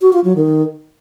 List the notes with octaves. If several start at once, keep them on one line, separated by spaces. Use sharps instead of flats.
F#4
F4
F#3
D#3